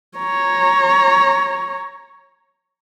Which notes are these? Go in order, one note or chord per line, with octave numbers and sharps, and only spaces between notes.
C#5 A#5